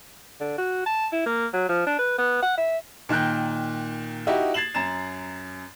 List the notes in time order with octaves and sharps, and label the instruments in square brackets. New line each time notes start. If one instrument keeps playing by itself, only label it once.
[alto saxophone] D3
F#4
A5
E4
A#3
F#3
F3
D4
B4
B3
F#5
E5
[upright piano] A#2 D#3 G5 F#6 G6
D#4 E4 F#4 G4
G#6 A6 C7 E7 F#7
F#2 A#5 A6 E7